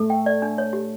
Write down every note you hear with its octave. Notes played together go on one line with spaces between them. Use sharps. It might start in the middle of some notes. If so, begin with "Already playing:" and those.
Already playing: A3 A4
G5
D5
D4
C#5
G4